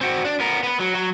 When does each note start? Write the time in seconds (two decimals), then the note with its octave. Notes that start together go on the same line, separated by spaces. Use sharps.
0.01 C4 F#4
0.25 D4
0.40 B3 A#4
0.63 B3 B4
0.80 F#3
0.95 F#3